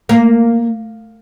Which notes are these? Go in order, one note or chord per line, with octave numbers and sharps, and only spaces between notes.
A#3